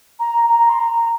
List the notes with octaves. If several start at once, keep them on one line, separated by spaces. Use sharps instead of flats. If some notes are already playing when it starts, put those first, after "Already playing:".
A#5
A#5
C6
A#5